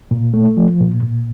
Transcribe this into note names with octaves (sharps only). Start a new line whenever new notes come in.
A#2
A3
F3
A#2
A#2